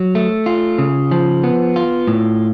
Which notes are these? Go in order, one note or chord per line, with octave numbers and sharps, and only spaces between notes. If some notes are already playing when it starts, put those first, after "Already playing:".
Already playing: F#3
A3
F4
C#3
F3
B3
F4
A2